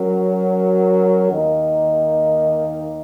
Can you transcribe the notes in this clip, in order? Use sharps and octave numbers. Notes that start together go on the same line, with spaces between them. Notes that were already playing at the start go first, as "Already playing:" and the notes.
Already playing: F#3 C#4 F#4 A#4
D#2 D#3 A#3 D#4